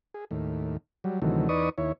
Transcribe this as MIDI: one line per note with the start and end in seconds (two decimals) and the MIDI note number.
0.14 0.25 68
0.31 0.77 39
0.31 0.77 45
1.04 1.20 54
1.04 1.20 55
1.22 1.48 38
1.22 1.48 48
1.22 1.48 51
1.22 1.48 52
1.22 1.48 54
1.22 1.48 57
1.49 1.69 40
1.49 1.69 63
1.49 1.69 71
1.49 1.69 74
1.49 1.69 85
1.49 1.69 87
1.78 1.92 39
1.78 1.92 64
1.78 1.92 73